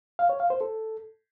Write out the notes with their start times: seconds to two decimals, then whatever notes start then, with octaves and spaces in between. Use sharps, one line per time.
0.19 F5
0.29 C#5
0.40 F5
0.50 C5
0.61 A4